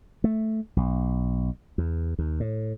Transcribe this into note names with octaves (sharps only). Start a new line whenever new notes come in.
A3
B1
E2
D#2
A2